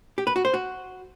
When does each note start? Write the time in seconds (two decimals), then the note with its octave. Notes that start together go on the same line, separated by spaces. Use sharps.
0.18 G4
0.27 B4
0.36 F#4
0.45 C5
0.54 F#4